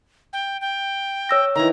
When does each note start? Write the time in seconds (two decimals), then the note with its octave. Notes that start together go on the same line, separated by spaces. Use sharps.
0.33 G5
0.61 G5
1.29 C#5 E6 A#6
1.55 D#3 E3 A#5